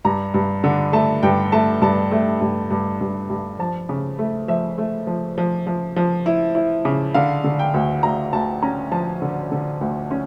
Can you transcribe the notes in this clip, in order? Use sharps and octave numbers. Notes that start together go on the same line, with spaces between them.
G2 A#5
G2
D3
A3 A5
G2 G5
A3 A5
G2 A5
A3
G2
G2
G2
G2
F3 A5
C#3
A3
F3 E5
A3
F3
F3
F3
F3
E4
E4
C#3
D3 F5
D3
G5
D2
D2 A#5
D2 A5
C#4 A#5
F3 A5
D3
D3
D2
C#4